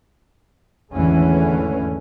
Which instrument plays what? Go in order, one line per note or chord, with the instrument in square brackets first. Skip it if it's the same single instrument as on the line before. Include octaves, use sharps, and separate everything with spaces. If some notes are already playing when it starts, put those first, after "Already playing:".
[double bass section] G#1 E2 D3 E3 A3 C#4